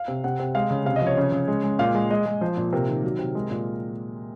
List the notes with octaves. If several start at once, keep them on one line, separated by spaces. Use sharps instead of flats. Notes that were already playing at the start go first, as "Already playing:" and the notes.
Already playing: F5
C3
C3 F#5
C3
G#3 F5
C#3
C3 F5
D#5
F3 C#5
C#3
C#3
G#3
G#3
A#2 F5
G#3
G#3 D#5
G#3
F3 C5
A#2
C3 A#4
D#3
F#3
C3
G#3
A#2